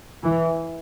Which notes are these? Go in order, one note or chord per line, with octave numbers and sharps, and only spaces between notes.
E3